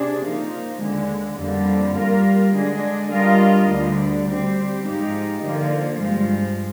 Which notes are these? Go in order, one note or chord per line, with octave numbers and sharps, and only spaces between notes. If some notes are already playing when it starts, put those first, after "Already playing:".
Already playing: C3 D4 G#4
F3 A#3 D#4
D#2 D3 G#3
F2 D3 G3 A#3
G3 A#3 F4 A#4
D3 G#3 D4 G#4 D#5
G3 D4 F4 A#4 D#5
D2 D3 G3
G3 C4 G4 C5
G#2 F3 G#3 D#4 G4
D3 F3 A#3
G2 F3 G#3